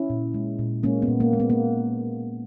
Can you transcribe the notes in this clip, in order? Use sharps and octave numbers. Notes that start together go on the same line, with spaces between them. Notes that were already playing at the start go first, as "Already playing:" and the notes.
Already playing: C#4 E4
A#2
G#3
A#2
G#3 A#3 C#4
B3
A#2
A#3
G#3
B3
A#3